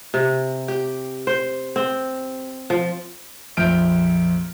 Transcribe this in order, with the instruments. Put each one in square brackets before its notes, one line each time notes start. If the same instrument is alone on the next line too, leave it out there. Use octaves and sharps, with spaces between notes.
[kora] C3
G4
C5
C4
F3
[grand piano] A#1 F2 E5 F6 G6 D7